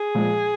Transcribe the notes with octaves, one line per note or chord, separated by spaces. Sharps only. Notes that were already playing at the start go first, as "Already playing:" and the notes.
Already playing: G#4
A#2 F3 G#3